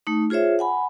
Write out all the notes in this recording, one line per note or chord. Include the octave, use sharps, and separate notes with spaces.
A3 D#4
F4 G#4 C5 C#5 E5
F#5 G#5 B5